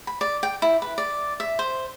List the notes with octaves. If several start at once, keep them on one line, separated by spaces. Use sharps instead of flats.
B5
D5
G5
E4
B4
D5
E5
C5